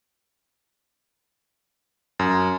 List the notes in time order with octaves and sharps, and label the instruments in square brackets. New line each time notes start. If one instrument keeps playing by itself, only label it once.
[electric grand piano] F#2